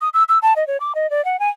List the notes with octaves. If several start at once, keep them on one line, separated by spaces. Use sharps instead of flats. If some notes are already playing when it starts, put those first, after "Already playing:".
D#6
E6
E6
A5
D#5
C#5
D6
D#5
D5
F#5
G#5